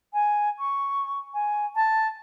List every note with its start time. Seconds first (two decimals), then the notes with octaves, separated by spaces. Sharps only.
0.13 G#5
0.59 C#6
1.34 G#5
1.75 A5